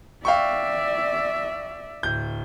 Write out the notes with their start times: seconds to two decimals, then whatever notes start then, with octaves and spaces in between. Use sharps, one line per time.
0.25 D5 E5 F5 G5 C#6
2.03 D1 G6